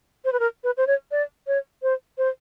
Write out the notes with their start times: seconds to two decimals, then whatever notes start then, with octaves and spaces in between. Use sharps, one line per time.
0.25 C5
0.33 B4
0.40 A#4
0.64 B4
0.77 C5
0.87 C#5
1.11 D5
1.47 C#5
1.83 C5
2.18 C5